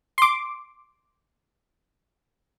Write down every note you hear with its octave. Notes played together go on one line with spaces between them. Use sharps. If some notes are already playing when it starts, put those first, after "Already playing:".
C6 D6